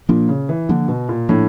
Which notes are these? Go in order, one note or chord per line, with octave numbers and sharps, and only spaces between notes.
A#2 F3 A#3 D4
C#3
E3
D3 F3 A#3 D4
B2
A#2
A2 F3 A#3 D4